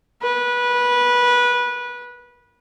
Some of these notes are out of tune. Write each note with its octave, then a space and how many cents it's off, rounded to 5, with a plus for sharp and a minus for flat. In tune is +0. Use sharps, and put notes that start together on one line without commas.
B4 -20